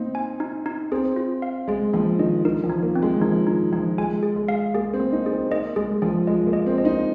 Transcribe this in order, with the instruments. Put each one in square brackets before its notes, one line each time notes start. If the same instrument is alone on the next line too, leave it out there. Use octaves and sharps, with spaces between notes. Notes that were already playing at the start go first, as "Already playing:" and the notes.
Already playing: [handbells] A#3 [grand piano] C4 D#4
[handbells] G#5
D#4
D#4
[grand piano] C4 [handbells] G#4
[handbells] F4
F5
[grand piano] G#3 [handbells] G#4
[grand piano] F3 [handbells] A#3
[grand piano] D#3 [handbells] D#5
[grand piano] D#3 [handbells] A#4
[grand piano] F3
[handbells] D#4
[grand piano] A#3
[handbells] C4
[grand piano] G#3
[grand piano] F3 [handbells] D#4
[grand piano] D#3 [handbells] D#4
[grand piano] F3 [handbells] D#4
[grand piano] G#3 [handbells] G#5
[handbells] G#4
[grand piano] G#3
[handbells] F5
[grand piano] A#3 [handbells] G#4
[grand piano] C4
[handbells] A#3
[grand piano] D#4
[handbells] G#4
[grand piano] C4
[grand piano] A#3 [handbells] D#5
[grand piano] G#3 [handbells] G#4
[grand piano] F3 [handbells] G#4
[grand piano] G#3 [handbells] D#5
[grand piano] A#3
[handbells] D#5
[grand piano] C4
[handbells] D#5
[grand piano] D#4